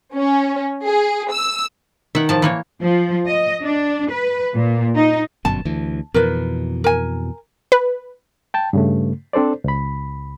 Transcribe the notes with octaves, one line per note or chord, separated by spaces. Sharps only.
C#4
G#4
E6
D#3 E5 F#5
A2 F3 A5
E3 A#3 C#5
F3
D#5
D4
B4
A#2
D#4
G1 F#2 B2 A5
D2 E3
F2 B2 E3 A#4 B4
A#4 G#5
B4
G5 A5
G2 C#3 A3
C4 D4 A4 C5 D5
C#2 B5